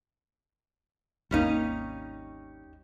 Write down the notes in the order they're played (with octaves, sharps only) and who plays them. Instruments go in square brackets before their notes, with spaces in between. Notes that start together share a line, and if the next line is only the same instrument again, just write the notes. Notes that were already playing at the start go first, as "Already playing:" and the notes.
[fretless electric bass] G#1 D#2 A#3 [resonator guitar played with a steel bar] G3 C#4 D#4